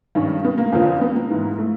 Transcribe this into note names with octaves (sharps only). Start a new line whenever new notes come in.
G2 D#3 C#4
B3
A#3
F2 D3 F3 A#3
B3
A#3
G#2 E3
A3